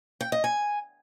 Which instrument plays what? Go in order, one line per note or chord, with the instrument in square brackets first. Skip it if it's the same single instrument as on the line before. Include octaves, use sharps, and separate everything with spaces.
[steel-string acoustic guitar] G5
D#5
G#5